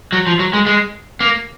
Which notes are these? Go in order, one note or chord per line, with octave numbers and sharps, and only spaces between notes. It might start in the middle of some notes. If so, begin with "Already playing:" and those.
F#3
F3
F#3
G#3
G#3
A#3